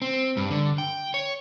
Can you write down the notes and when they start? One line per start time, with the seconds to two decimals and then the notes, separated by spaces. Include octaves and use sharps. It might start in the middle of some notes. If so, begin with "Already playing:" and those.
0.02 C4
0.37 G2
0.51 D3
0.78 G5
1.14 C#5